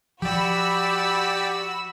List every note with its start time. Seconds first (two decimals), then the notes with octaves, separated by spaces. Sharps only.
0.22 F3 F#4 G4 D5 B5 E6